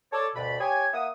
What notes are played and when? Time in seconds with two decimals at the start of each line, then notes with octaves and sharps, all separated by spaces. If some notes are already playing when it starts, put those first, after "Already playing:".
0.13 A4 C#5 D5
0.35 D2 G2 B2 D5 B5
0.60 G4 C#5 G#5
0.93 A#3 E5 F#5 D#6